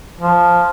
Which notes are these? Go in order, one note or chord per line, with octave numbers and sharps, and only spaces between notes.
F3